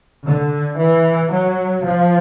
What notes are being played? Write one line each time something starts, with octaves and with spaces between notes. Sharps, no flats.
D3
E3
F#3
F3